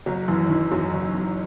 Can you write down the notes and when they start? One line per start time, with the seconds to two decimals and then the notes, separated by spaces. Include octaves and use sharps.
0.06 F#1 F#3
0.28 F#2 E3
0.49 D#3 E3
0.71 F#2 F#3
0.93 F#1
1.15 F#2